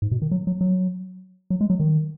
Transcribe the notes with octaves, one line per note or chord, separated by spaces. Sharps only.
G#2
B2
D#3
F#3
F#3
F#3
F#3
G#3
F#3
D#3